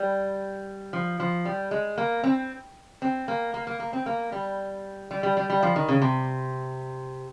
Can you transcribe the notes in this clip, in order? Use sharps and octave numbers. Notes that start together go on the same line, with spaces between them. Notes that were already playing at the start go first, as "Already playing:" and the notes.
Already playing: G3
F3
F3
G3
G#3
A#3
C4
C4
A#3
A#3
A#3
A#3
C4
A#3
G3
G3
G3
G3
G3
F3
D#3
C#3
C3